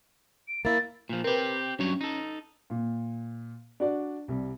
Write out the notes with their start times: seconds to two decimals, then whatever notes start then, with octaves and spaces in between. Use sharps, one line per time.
0.48 D7
0.65 A#3 E4 A6
1.09 A#2 F3
1.24 C4 G4 A#4 B4
1.79 G2 F#3 C#4 C#5
2.01 D#4 A4
2.70 A#2
3.80 D4 F#4 D5
4.28 C2 G3